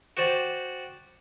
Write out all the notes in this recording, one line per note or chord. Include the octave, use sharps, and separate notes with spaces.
F#4 G4 C5 D5